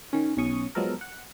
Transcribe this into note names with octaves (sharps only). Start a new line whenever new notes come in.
D#3 C#4
B1 C#4 C#6 D#6
F3 F#3 G#3 B3 A4 A#4
F#5